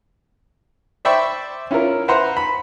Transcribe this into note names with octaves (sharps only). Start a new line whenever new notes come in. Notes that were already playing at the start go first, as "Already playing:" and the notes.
C5 D5 E5 G5 B5 C#6
C#4 E4 F4 A#4
B4 C5 E5 F#5 A#5 C6
B5